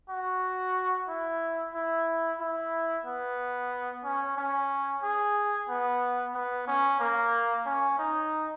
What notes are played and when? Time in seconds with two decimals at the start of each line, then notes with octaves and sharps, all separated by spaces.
0.10 F#4
1.09 E4
1.74 E4
2.40 E4
3.05 B3
4.04 C#4
4.37 C#4
5.03 G#4
5.69 B3
6.34 B3
6.67 C#4
7.00 A#3
7.66 C#4
7.99 D#4